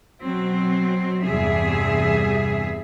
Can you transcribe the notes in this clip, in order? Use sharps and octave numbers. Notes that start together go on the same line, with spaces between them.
B2 F#3 C4
E2 G2 C3 G#4 E5